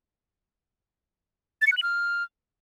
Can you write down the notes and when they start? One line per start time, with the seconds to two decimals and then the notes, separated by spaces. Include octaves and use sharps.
1.62 A6
1.67 C#7
1.72 F#6
1.77 F#7
1.83 F6